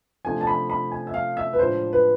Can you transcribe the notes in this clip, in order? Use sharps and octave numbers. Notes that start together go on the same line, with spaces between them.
C3 F3 A3 D4 G#5
A5
B5
B5
G#5
E5
F5
E5
B4
A2 F3 G#3 D4 F4 C5
B4